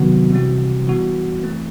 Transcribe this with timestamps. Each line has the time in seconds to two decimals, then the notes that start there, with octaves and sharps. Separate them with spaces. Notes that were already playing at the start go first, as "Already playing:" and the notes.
Already playing: C3 D#3 F#3 B3 F#4
0.31 C3 E3 G3 C4 F#4
0.87 E3 G3 B3 F#4
1.43 E3 A3 C4